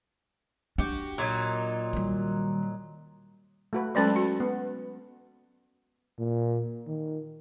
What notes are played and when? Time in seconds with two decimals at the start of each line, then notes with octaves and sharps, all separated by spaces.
0.78 D4 F#4 G4
1.18 A#2 F#3 D#4
1.93 D#3 G3
3.73 A3 F#4 B4
3.95 F#3 G#3 C#4 A4 B4 C5
4.16 F#4
4.40 B3
6.19 A#2
6.87 D#3